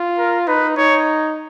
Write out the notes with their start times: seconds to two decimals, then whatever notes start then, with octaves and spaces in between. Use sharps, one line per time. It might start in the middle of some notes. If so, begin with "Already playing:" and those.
Already playing: F4
0.18 A#4
0.48 D#4 B4
0.77 D#4 C#5